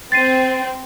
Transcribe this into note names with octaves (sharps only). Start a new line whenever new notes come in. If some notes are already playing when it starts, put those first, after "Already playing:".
C4 A6 C7 D#7